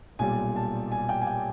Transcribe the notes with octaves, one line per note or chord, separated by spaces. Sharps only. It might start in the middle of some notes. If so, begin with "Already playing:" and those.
B1 A#2 G3 G#5
A5
G#5
G5
G#5
G5